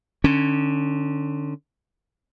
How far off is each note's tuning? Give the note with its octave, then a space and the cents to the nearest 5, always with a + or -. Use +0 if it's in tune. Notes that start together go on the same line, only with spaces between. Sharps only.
D3 +25 C#4 +0